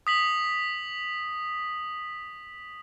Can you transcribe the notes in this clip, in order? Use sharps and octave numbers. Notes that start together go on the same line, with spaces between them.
D#6 B6 F#7